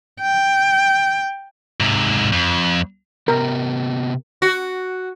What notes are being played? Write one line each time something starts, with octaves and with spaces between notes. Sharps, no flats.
G5
G#2 C3
F2
C3 B3 G4 A#4
F#4